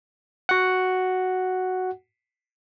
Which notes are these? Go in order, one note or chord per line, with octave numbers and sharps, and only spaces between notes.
F#4 F#5